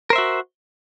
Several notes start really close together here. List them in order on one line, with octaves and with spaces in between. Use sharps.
A#4 C5 E5 F#4